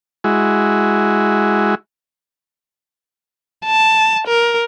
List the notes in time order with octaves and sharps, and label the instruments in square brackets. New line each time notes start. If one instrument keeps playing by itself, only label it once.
[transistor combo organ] G#3 E4 F#4
[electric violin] A5
A#4